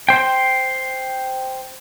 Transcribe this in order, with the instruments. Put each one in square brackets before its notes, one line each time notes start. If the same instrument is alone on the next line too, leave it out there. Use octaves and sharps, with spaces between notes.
[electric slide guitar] C5 G5